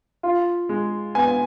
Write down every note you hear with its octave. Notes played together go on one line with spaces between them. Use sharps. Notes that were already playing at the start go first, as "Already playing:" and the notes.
F4
G#3
B3 G#5